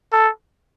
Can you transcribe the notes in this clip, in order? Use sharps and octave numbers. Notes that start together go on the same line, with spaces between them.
A4